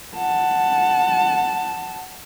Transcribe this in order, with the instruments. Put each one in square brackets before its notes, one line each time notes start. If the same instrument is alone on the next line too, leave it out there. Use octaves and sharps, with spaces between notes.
[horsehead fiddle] F#5 A5